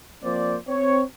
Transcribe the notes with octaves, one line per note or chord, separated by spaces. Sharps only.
F3 A#3 C4 C5 D5
C4 C#5